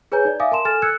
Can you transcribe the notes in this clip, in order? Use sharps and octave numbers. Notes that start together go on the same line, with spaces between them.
G#4 B4 C#5 G#5 A#5 G6
D#4 D5
E5 F5 G#5 D6 D#6
A#4 A5 C6 E7
A4 G#5 F6 A6 E7
E6 F#6 G#6 C#7